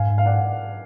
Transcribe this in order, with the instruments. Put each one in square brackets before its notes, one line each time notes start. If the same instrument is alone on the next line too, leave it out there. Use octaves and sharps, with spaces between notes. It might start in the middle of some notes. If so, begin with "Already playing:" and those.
Already playing: [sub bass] G#2 [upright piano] F5 G#5
[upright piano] F5
D5 F#5